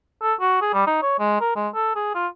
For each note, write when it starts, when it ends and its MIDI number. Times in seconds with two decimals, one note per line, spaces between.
0.22 0.34 69
0.41 0.60 66
0.62 0.70 68
0.74 0.87 55
0.87 1.02 63
1.02 1.19 73
1.19 1.38 56
1.41 1.53 70
1.56 1.68 56
1.74 1.95 69
1.96 2.11 68
2.15 2.27 65